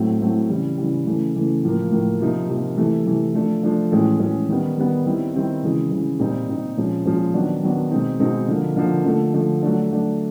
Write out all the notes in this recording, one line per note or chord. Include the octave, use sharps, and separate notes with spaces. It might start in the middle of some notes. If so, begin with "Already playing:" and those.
Already playing: A2 F#3 A3 C4 E4
A2 F#3 A3 C4 E4
C#3 E3 G3
C#3 E3 G3
C#3 E3 A3
C#3 E3 A3
A2 F3 A#3
A2 F3 A#3
C3 F3 A#3 D#4
C3 F3 A#3 D#4
C3 E3 A3
C3 E3 A3
F3 A3 D4
F3 A3 D4
A2 E3 G#3 C#4
A2 E3 G#3 C#4
D#3 G3 B3
D#3 G3 B3
D#3 G3 C4 E4
D#3 G3 C4 E4
C#3 E3 G#3
C#3 E3 G#3
A#2 G3 C4 D#4
A#2 G3 C4 D#4
A#2 F3 G#3 C#4
A#2 F3 G#3 C#4
D#3 F#3 B3 D4
D#3 F#3 B3 D4
B2 G#3 C4 D#4
B2 G#3 C4 D#4
D3 F3 A#3
D3 F3 A#3
D3 F3 A3
D3 F3 A3
F#3 A3 D4
F#3 A3 D4